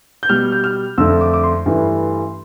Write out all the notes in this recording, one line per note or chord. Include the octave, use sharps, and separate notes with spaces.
G6
B2 G3 F6
G6
F6
F2 D3 A3 E6
D6
D6
C6
G2 E3 A3